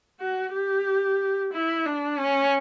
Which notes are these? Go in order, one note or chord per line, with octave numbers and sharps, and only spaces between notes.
F#4
G4
E4
D4
C#4